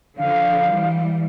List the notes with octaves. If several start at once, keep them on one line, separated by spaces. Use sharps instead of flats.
D3 F3 F5
E3 G3